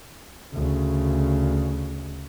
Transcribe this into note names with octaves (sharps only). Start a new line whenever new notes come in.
D2 C#3